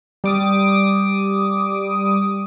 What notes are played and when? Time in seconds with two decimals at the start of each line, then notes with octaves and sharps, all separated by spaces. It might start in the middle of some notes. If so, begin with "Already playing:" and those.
0.24 G3 D6 D#6